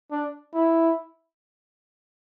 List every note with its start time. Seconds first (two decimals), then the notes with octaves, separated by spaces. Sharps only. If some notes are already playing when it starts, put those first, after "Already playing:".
0.11 D4
0.54 E4